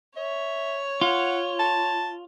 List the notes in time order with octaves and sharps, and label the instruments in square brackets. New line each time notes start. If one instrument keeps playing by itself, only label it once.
[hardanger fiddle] C#5 [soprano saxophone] E5
[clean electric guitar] F4 [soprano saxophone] F#5
[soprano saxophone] A5